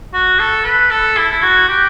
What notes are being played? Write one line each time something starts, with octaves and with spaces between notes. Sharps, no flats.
F#4
A4
B4
A4
E4
E4
F#4
G4